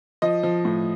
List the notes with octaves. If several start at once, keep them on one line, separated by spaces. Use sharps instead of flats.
F3 D#5
F3
A2